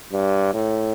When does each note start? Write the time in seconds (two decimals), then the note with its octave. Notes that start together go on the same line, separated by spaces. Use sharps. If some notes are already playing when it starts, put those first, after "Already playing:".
0.12 G2
0.54 A2